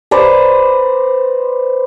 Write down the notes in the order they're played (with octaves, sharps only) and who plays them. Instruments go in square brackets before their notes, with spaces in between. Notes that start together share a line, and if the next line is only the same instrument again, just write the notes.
[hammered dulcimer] B4 C5 D5 A#5